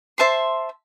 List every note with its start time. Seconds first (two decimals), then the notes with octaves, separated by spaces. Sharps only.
0.18 C5 E5 A5 C6